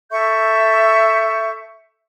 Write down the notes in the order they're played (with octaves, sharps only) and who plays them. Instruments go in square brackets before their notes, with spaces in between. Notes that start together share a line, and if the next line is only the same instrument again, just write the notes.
[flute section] A4 E5 C#6 G6